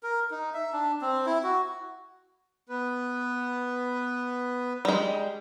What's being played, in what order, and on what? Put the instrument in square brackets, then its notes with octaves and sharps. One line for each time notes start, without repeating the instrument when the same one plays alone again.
[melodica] A#4
D#4
E5
D4
C4
E4
F#4
[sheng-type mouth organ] B3 B4
[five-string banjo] G3 G#3